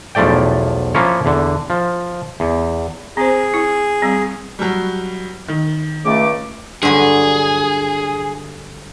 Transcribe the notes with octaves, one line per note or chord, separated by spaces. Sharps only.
B1 E2 F3 A3 D5 G5
F3 A#3 C#4 E4 C#5
E2 D3
F3
E2
C4 G#4 C5
E4
G3 C4
F#3 G3
D#3
C#2 A3 D6
G2 D3 F#3 G#4